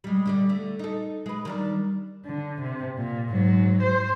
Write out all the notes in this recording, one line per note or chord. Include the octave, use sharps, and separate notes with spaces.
G3 G#3
D3 G3 D5
D3 A3
D#4 A4
G#3 B4
D#3 G3 D4
D3
C3
A#2
G#2 F#3
C5